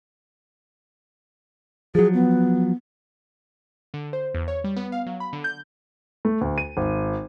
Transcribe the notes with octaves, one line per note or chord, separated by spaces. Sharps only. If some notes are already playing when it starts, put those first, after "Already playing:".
F3 F#3 G#4
B3
D3
C5
E2
C#5
G3
B3
F5
F#3
B5
D3
G6
A3
D2
D#7
G#1